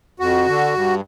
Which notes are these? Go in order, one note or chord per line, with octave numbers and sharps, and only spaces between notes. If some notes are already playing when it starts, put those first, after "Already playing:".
F2 F#4
D3
G2